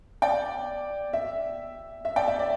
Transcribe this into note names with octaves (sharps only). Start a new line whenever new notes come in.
D5 G5
E5
E5
D5 G5
E5
D5